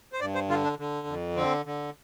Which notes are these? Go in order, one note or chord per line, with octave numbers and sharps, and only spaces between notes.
C5
G2 D5
C5
D3 F4
D4
D3
F2
D3 C4
D3